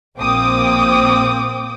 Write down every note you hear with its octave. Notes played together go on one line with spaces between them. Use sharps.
A#1 A#3 C4 G5 D6 D#6